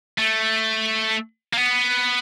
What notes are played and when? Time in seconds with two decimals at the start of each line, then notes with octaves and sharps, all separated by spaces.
0.18 A3
1.53 A#3
1.57 B3